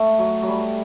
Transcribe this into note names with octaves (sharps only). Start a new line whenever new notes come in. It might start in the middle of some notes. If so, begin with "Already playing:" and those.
Already playing: A3
F#3
F#3
G3